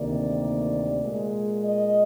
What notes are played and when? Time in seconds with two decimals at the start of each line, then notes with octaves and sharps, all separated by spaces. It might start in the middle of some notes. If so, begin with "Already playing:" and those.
Already playing: D2 C3 D#3 A#3 D5
1.02 A#2 G#3
1.62 D#5